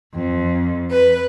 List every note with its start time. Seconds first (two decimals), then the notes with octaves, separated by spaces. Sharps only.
0.14 F2
0.92 B4